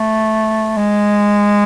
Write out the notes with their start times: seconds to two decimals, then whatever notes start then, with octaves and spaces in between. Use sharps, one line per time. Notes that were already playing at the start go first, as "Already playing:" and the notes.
Already playing: A3
0.76 G#3